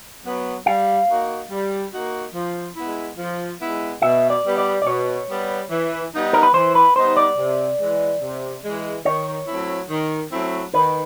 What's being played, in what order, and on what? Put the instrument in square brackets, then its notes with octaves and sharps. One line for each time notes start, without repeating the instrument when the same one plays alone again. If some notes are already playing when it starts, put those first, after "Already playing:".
[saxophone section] F#3 B3
[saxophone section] G3 [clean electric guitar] F5
[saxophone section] A#3 D#4 F#4
G3
A#3 D#4 F#4
F3
G#3 B3 E4
F3
G#3 B3 E4
[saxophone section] B2 [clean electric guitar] E5
[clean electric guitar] D5
[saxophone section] G3 B3
[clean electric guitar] D5
D5
[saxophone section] B2 [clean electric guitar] C#5
[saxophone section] G3 B3
E3
G3 B3 D#4
[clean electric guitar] A#4
B4
[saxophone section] E3 [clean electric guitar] C5
[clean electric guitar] B4
[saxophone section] G3 B3 D#4 [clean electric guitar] C5
[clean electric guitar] D5
[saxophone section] C3
E3 G#3
C3
E3 G#3
[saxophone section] D#3 [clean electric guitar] C#5
[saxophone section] F#3 A3 C4 E4
D#3
F#3 A3 C4 E4
[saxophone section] D#3 [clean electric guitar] B4